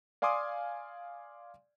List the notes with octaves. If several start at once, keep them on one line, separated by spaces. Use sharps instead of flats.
D5 F5 G#5 C6 D6 D#6